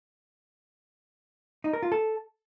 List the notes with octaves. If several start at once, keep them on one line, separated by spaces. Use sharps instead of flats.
D#4
A#4
F4
A4